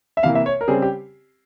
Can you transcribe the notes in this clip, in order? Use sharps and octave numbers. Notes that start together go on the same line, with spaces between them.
E5
C3 E3 A#3 F5
E5
C#5
A#4
C#3 G3 C4 G#4
G4